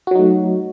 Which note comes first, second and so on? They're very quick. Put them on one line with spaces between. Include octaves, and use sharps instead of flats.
F#4 F#3 D#4 A3